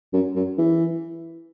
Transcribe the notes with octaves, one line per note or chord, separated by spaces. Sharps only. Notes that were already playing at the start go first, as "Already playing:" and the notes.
F#2
F#2
E3